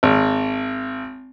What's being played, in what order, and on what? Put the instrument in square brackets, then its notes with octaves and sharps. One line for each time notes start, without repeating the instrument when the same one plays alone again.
[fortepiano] G#1